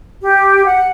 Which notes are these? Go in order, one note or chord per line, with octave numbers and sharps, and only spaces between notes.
G4
F#5